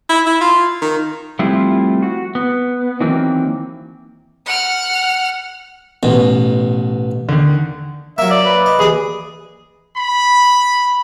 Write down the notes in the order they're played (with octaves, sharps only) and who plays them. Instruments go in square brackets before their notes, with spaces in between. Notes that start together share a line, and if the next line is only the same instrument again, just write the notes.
[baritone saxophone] E4
E4
F4
D#3
[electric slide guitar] F3 G3 A3 C4 E4 F4
F#4
B3
D#3 E3 F#3 A#3 C4
[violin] F#5 F6
[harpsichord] A1 B2
[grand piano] D3 D#3
[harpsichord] F#3 A#3 [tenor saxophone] E5
[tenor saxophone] D5
[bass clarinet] B4
[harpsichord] D#5
[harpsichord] D#2 B5 [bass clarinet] E3 [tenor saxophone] G#4
[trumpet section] B5